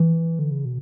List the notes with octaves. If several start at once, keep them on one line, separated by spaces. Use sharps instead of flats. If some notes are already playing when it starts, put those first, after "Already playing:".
Already playing: E3
D3
C#3
B2